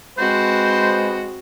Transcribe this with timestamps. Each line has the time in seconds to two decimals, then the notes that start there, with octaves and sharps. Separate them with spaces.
0.18 G#3 C4 F#4 B4 C5